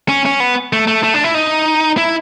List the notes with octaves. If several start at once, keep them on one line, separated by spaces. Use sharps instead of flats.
C#4
C#4
B3
A3
A3
A3
D4
E4
D#4
E4